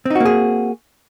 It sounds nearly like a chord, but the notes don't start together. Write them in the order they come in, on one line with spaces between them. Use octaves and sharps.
C4 D#4 F#4 A#3 G#4